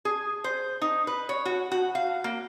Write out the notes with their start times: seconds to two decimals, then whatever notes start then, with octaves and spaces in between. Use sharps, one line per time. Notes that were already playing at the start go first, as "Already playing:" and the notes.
0.05 G#4
0.44 C5
0.82 D#4
1.07 B4
1.29 C#5
1.45 F#4
1.72 F#4
1.95 F5
2.24 A#3